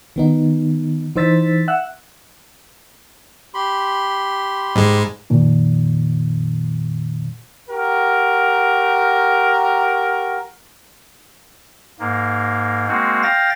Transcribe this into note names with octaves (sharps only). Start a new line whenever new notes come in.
D#3 B3 D#4
E3 D#4 C5 E6 A6 B6
E5 F#5 E6 F#6
G4 B5 C6
G#2 G#3
F2 A#2 D#3
F#4 G4 A#4
G#2 A#3
G#3 A#3 C4 F#4
F5 G5 A6 A#6